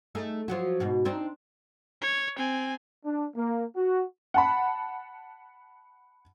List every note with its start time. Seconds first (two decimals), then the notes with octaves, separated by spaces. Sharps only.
0.15 A3 D#4 G#4
0.48 F3 F#3 F#4
0.80 G#2 B2 F#4
1.05 C4 D4 D#4
2.02 C#5
2.38 C4 G#5
3.05 D4
3.36 A#3
3.77 F#4
4.34 F#5 A5 B5